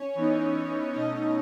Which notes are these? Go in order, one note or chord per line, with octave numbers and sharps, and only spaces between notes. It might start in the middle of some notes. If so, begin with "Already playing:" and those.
Already playing: C#4 C#5
E3 B3 D#4
B2 A3 C#4 D#4 D#5